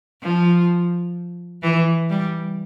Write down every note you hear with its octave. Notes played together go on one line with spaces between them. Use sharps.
F3
E3
G3